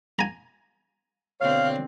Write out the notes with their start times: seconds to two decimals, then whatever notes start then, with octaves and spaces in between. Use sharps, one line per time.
0.19 G#5 A#5
1.41 B2 D3 C4 C#5 F5